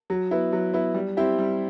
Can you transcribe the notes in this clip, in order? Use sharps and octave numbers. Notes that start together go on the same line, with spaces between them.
F#3
B3 E4
F#3
B3 E4
G3
C4 E4 G4
G3